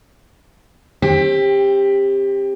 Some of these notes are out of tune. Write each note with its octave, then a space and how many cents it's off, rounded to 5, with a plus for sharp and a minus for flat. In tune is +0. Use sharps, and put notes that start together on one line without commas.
C4 +35 G4 +15